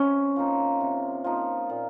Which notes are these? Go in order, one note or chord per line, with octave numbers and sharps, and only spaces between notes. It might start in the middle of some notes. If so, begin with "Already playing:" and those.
Already playing: C3 C#4
F3 A#3 D#4
C3
F3 A#3 D#4
A#2